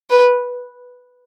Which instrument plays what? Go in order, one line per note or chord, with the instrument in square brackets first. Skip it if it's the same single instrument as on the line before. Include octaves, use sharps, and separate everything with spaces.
[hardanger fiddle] B4